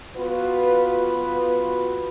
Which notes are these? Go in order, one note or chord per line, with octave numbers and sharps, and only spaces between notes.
B3 F4 F#4 B4